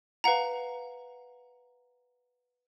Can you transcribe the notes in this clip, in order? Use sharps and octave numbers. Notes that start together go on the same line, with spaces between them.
B4 F5 F#5 A#5